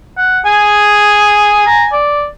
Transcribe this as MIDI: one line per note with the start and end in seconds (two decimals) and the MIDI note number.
0.18 0.39 78
0.46 1.63 68
0.46 1.98 80
1.66 1.84 82
1.92 2.26 74